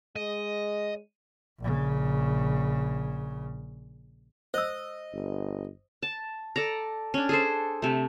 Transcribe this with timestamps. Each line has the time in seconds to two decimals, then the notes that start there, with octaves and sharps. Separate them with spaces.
0.16 G#3 D#5
1.59 A#1 C#3
4.54 C5 D#5 E6
5.14 G1
6.02 A5
6.56 A4 D5 A#5
7.14 C#4 D4
7.29 G#4 A4 C5
7.82 C3 A3